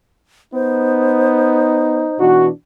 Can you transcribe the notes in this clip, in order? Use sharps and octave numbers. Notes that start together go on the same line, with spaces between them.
B3 D#4 C5
B2 E3 D4 F#4